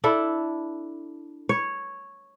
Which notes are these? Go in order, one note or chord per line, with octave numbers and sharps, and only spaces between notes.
D4 E4 A4
C#5